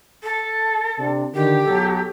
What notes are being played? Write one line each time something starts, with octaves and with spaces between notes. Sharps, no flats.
A4
C3 D4
D3 D#3 G4
B1 F#3 A4